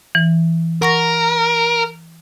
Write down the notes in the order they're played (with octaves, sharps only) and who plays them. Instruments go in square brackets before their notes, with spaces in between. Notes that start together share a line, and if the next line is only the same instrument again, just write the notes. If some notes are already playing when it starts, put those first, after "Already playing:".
[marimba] E3
[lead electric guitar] A#4 [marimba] F#5 C#6 A#6